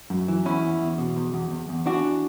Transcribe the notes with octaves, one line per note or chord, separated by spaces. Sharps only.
F#2
E3
E2 C#4 E4
E2
E2
B2
E2
E2
E2
E2
E3 D4 F#4